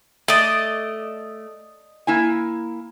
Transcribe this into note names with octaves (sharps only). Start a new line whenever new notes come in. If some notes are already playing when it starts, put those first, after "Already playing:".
A3 D5 D#5
A#3 E4 G#5